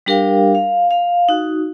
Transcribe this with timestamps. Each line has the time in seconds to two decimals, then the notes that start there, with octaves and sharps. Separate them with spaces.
0.06 G3 D4 G4 A#4 F5 G5
0.55 F5
0.91 F5
1.29 D#4 F#4